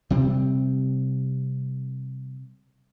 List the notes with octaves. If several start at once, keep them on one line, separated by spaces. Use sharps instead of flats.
C3 G3 C4